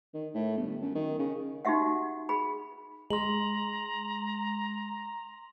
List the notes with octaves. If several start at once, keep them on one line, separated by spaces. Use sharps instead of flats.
D#3
A2
G1
F#2
D#3
C#3
D#4 F#4 G4 E5 F#5
G#4 B5
G#3 A#5 C6 F#7